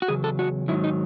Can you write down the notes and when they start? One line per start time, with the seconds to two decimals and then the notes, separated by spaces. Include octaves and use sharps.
0.02 F#4
0.08 E2 C#3 F#3 G#4
0.24 A4
0.39 F#4
0.68 G#2 D#3 F#3 E4
0.84 D#4